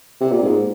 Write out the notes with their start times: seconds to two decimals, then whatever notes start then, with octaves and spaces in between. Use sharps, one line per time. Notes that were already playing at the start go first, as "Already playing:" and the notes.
0.21 C3
0.32 A#2
0.43 G#2